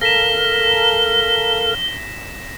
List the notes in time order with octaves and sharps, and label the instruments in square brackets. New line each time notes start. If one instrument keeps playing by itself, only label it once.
[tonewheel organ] A4 A#4 F5 [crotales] A#6 B6 E7 [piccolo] G7